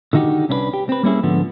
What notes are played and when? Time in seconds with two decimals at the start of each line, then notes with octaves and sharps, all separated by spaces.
0.13 D3 D#3 D#4 F#4 G4
0.49 C2 C#4 D4 E4 B4
0.73 G4
0.89 C4 B4
1.03 G3 A#3 C#4 E4 G#4
1.23 G#2 D3 F3 B3